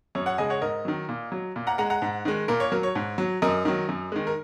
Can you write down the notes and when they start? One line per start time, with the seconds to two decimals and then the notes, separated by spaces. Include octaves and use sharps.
0.15 F#2 C#5
0.26 C#5 F#5
0.38 C#3 G#3 D#5 G#5
0.50 C#5 F#5
0.62 G#2 A#4 D#5
0.85 D#3 F#3
1.09 A#2
1.32 F#3
1.56 A#2
1.67 F#5 A#5
1.78 G#3 F#5 A#5
1.90 F#5 A#5
2.02 G#2
2.25 D#3 G#3
2.48 A#2 A#4
2.60 C#5
2.72 F#3 A#4
2.83 C#5
2.95 G#2
3.18 F#3
3.42 F#2 A#4 D#5
3.65 D#3 F#3
3.89 F#2
4.12 D#3 G#3
4.27 A#4